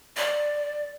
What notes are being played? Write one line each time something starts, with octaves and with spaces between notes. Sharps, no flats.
D5